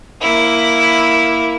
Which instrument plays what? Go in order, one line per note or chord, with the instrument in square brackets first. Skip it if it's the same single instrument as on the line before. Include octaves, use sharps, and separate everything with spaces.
[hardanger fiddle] A#3 E4